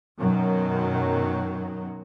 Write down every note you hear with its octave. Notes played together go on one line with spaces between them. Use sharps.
F#2 B2 D#3 F#3